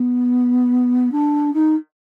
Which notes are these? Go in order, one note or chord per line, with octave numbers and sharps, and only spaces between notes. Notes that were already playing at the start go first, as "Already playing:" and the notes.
Already playing: B3
D4
D#4